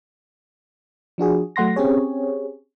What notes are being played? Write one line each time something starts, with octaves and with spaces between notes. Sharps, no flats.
F3 D4 F#4 G#4
F#3 A3 F#5 C6 A#6
C4 C#4 G4 G#4 C#5